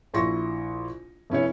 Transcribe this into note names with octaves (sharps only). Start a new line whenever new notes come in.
A#1 E4 C6 C#6 A#6
F1 C#4 E4 C#5